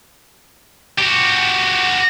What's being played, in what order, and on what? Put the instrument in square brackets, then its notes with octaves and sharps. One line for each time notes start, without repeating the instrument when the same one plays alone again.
[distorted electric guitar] F#4 G4